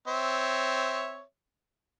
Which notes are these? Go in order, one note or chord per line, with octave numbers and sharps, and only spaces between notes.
C4 C#5 E5